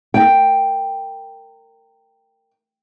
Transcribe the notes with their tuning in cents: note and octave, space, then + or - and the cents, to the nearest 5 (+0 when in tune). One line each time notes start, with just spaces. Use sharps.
A#4 -25 G5 +0